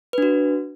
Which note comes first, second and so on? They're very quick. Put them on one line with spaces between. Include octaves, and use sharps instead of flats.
B4 D4 F#4